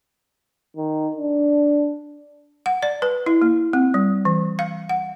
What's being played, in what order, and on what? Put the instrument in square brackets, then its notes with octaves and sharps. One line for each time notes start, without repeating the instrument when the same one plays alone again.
[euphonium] D#3
D4
[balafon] F#5
D5
B4
E4
A#3
C4
G3
E3
F5
F#5